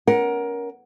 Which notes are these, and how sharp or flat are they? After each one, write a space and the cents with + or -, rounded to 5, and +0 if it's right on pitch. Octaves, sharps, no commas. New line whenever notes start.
C#4 +20 A#4 +20 F#5 +0